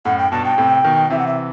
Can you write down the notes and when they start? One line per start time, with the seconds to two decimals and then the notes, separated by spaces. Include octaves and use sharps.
0.05 F#2 A2 F#5
0.18 G5
0.32 G2 B2 A5
0.45 G5
0.58 A2 C3
0.84 B2 D#3
1.10 C3 E3 E5
1.19 F#5
1.27 E5